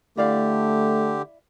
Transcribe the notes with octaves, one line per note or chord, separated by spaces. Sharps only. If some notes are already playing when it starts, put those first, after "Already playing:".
D3 A3 E4 G4 D5 F5